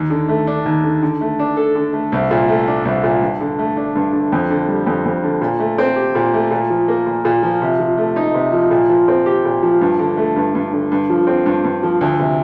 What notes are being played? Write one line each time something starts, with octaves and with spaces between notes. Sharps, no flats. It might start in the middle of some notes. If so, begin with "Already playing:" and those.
Already playing: D#2
D3
A3
D4
D#2
D3
D3
A3
D4
A4
D3
A3
C2
A#2
A3
D4
C2
A#2
G2
D3
A3
D4
G2
D3
F2
D3
G3
F2
F2
D3
A#2
A3
C4
G4
A#2
A3
A#2
F3
A#3
A#2
A#2
F3
C3
F3
A3
D#4
C3
F3
A#2
F3
C4
G4
A#2
F3
G2
D3
A3
G2
G2
D3
G2
F3
C4
G2
G2
F3
D2
C3